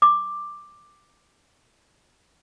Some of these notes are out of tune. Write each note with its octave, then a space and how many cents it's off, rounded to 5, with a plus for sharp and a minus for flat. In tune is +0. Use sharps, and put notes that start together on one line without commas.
D6 +10